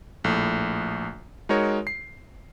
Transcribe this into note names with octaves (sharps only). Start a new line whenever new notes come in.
A#1 A2 A3
G#3 D#4 F#4 A#4 C#5
C7